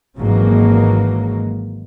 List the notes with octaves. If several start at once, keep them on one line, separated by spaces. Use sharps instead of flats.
G#1 C#3 E3 F#3 G#3 A#3